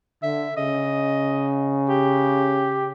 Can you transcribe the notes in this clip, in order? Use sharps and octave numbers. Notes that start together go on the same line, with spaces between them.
D3 E5
C#3 D#5
G4